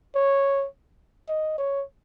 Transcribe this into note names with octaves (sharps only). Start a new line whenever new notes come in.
C#5
D#5
C#5